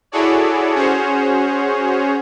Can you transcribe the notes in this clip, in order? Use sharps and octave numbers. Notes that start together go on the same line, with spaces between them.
E4 F#4 G#4 A4 C#5 D5
C#4 F#4 G#4 C5 C#5